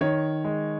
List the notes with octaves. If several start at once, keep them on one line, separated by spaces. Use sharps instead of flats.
D#3 C#5
G#3